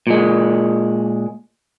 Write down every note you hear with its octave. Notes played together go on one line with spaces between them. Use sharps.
A#2 G#3